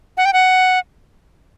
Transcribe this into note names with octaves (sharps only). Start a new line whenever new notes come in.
F#5
G5
F#5